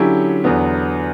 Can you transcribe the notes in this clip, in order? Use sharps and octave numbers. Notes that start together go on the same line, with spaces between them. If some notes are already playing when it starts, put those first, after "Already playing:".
Already playing: D3 F#3 C#4 E4 G4
E2 D3 F#3 B3